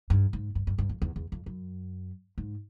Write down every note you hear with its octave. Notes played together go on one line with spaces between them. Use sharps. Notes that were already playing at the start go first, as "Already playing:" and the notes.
G2
G#2
G2
G2
G2
F2
E2
E2
F2
F#2
G#2